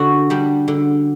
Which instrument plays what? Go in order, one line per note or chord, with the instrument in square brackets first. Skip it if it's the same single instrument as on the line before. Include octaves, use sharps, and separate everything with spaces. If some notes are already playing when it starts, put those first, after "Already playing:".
Already playing: [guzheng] D3 F#4
G3 D4
D3